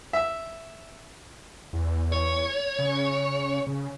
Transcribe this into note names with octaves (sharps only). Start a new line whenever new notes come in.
E5
E2
C#5
C#3
C#3